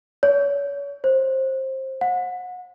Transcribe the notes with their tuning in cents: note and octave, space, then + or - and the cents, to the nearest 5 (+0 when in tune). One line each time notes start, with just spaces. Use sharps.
C#5 +35
C5 +20
F#5 -30